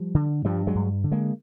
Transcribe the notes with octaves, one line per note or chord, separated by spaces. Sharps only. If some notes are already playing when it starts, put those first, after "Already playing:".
Already playing: F3 G3
D3
G2 F3 G3
F#3 G#3
G2
D3
G#3 A#3